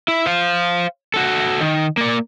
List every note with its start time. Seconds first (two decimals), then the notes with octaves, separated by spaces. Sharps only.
0.08 E4
0.26 C5 F5
1.14 F#4 A4
1.61 D#3
1.97 A#3 D5